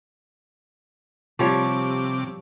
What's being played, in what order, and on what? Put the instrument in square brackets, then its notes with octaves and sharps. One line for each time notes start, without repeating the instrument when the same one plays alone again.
[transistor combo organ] C3 D6 [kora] F3 G3 C#5